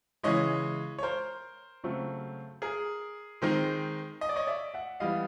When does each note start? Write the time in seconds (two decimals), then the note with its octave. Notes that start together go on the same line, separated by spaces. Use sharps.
0.23 C#3 E3 G#3 C#5 D#5
0.99 C#5
1.03 A#4 C5
1.84 C#3 F#3 A3 C4
2.62 G#4 A#4
3.42 D#3 G#3 C4 D#4
4.21 D#5
4.29 D5
4.36 C#5 D#5
4.47 D5 E5
4.74 E5 F#5
5.00 E3 G3 B3 D#5 F5